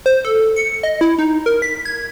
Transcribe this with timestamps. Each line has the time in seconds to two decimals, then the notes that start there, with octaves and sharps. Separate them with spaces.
0.06 C5
0.25 A4
0.56 C#7
0.83 D#5
1.01 E4
1.19 D#4
1.46 A#4
1.62 B6
1.85 G#6